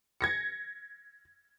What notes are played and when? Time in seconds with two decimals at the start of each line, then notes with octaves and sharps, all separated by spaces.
0.21 G#6 A#6 C#7